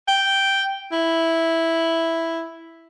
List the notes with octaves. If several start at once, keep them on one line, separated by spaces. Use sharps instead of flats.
G5
E4